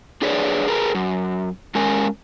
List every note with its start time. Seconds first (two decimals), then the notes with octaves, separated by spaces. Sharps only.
0.22 D4 G#4 B4 C#5 D5
0.68 G#4 A#4 B4
0.95 F#2
1.75 G#3 C#4 A#4 G#5